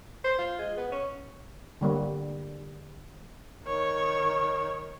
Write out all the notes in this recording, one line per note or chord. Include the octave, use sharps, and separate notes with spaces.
C5
F4
G#3
B3
C#4
D3 G3 A#3
D#3 C#5